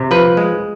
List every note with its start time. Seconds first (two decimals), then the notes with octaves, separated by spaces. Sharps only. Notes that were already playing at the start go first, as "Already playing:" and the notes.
Already playing: C3
0.11 F3 B4
0.37 G#3